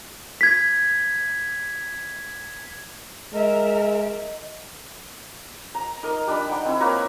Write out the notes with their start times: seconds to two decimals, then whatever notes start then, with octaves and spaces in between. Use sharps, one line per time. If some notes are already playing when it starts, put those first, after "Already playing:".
0.41 G#6 B6
3.33 G#3 A#4 D#5 E5
5.75 A#5
6.03 D#4 A#4 D#5
6.27 G3 D4 D#5 B5
6.49 D#4 F#5 G5
6.65 C4 E4
6.81 A#3 B4 C#5 A#5